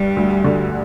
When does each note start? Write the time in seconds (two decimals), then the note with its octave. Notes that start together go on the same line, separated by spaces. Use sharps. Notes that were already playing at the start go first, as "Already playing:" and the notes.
Already playing: G2 G3
0.16 D2
0.44 D3